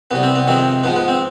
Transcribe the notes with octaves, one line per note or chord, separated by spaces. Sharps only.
C2 C3 G3 B3
C4
B3
F2 C3 D#3 G#3 C4
G#2 F3 G#3 B3
B3
C4